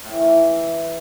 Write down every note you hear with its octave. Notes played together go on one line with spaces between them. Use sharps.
A2
E3
D#3
E3